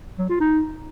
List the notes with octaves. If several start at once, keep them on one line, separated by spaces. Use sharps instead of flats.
F#3
F4
D#4